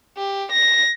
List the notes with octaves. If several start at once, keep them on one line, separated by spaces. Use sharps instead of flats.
G4
A#6